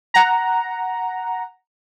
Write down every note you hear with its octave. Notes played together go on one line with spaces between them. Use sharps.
F#5 A#5